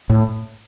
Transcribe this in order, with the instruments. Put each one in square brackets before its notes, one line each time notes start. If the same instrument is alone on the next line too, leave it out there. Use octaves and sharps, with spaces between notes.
[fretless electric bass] A2